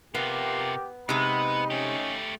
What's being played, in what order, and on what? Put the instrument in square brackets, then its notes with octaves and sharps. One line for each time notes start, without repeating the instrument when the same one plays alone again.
[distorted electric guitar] C3 F4 [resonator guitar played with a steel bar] B3 [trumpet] G4 [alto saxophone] A#4
[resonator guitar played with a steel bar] C3 G#3 [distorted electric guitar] B3 [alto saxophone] D#4 [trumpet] B5
[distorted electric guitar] A3 G4 [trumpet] C#4